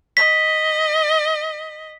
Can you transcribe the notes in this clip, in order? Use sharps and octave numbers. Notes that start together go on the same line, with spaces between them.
D#5 B6